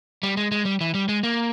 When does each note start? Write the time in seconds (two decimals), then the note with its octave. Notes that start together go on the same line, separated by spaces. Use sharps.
0.23 G3
0.37 G#3
0.52 G#3
0.65 G3
0.81 E3
0.94 G3
1.09 G#3
1.23 A#3